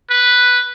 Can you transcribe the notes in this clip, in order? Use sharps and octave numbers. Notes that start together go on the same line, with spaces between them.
B4